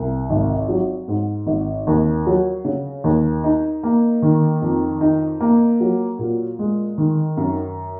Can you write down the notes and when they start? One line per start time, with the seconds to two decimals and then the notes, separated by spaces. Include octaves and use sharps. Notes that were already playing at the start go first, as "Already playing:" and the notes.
Already playing: C2
0.30 G#1
0.69 F#3
1.08 G#2
1.47 G#1
1.87 D#2
2.26 F#3
2.65 C#3
3.04 D#2
3.44 D#4
3.83 A#3
4.22 D#3
4.62 F2
5.01 D#4
5.40 A#3
5.80 F#3
6.19 A#2
6.59 G#3
6.98 D#3
7.37 F#2